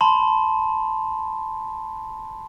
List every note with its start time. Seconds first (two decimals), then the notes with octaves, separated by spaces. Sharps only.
0.01 A5 B5 C6